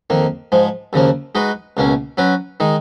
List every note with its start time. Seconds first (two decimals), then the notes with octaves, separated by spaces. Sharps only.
0.10 F2 D#3 A#3
0.52 G#2 F3 G#3
0.93 D#2 C#3 F3 A#3
1.35 G#3 D#4 F#4 B4
1.77 C#2 B2 A#3 C#4
2.17 F#3 C#4 F#4 B4
2.60 D#3 G#3 D#4